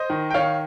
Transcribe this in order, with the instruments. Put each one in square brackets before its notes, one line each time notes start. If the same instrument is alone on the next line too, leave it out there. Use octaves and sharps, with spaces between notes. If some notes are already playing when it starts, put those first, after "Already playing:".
Already playing: [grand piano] C5 D#5
D#3
G5
D#3 C#5 F5